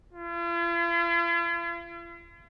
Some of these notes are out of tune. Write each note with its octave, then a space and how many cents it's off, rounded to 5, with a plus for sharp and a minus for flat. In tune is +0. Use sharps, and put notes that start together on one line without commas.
F4 -45